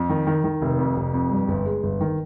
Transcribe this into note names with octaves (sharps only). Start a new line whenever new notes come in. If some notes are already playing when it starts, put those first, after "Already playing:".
Already playing: F2
D#3
D#3
D#3
F1
F2
F1
F2
G2
G1
G#3
G1
D#3